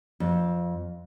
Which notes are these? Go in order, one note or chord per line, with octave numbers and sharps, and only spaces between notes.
F2